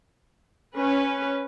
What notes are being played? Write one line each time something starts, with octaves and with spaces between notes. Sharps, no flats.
C#4 B4